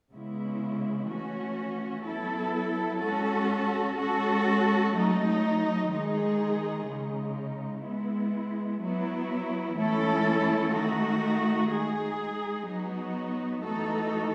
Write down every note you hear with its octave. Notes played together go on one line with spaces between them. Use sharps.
C#3 G#3 B3 E4
E3 A3 C#4 F#4
F#3 B3 E4 A4
G#3 C#4 F#4 A4
G#3 C#4 F#4 A4
F#3 A3 D#4
D#3 G#3 D#4 G#4
C#3 G#3 D#4
G#3 B3 E4
F#3 B3 E4
E3 A3 C#4 E4 A4
D#3 A3 D#4 F#4
G#3 D#4 G#4
F#3 B3 D#4 F#4
E3 A3 D#4 F#4 A4